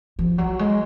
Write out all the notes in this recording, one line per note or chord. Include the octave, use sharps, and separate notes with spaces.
F3
F#3
G#3